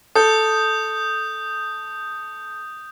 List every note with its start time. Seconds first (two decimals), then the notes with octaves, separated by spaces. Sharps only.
0.15 A4 D#6 G6